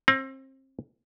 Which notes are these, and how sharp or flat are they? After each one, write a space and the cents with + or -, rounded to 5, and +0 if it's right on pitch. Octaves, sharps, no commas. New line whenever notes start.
C4 +30 F5 +45